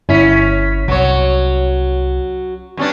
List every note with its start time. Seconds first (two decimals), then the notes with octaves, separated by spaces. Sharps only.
0.09 G1 C#4 E4 B6
0.88 C2 F#3 C#5
2.77 G2 C#4 D4